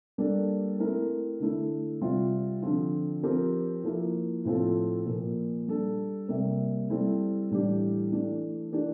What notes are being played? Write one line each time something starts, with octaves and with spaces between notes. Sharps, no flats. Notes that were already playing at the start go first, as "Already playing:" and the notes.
G3 A#3 D4 A4
A3 C4 E4 A#4
D3 A3 E4
C3 G3 C4 F4
D3 F3 C4 F4
F3 C4 G4 A#4
F3 A#3 E4 A#4
A2 F3 C4 F4 A4
A#2 F3 A#3
G3 D4 A4
C3 G3 A#3
G3 C4 E4 A4
A2 E3 G3 D4 G4
E3 A3 D4
E3 A#3 D4 G4